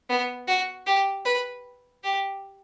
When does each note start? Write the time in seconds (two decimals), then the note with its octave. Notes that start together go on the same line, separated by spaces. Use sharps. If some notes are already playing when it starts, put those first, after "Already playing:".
0.09 B3
0.48 F#4
0.86 G4
1.25 B4
2.03 G4